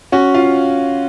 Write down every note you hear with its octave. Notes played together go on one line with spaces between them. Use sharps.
C#4 F#4
F4 F5